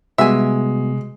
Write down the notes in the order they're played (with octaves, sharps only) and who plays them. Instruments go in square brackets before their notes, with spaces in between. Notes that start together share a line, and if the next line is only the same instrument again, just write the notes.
[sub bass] C3 [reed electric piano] G3 B3 F#4 [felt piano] G#3 [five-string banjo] E5 G#5